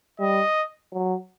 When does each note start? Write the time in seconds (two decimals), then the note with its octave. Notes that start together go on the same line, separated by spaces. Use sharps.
0.20 G3 D#5
0.93 F#3